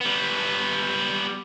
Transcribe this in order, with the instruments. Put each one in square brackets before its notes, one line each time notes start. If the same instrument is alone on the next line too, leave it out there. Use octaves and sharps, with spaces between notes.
[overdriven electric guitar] G3 B3